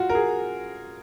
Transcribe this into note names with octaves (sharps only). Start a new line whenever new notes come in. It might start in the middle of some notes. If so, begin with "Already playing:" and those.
Already playing: F4 F#4
A#4
G#4